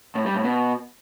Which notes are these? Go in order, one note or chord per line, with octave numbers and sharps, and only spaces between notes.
A2
G3
A2
B2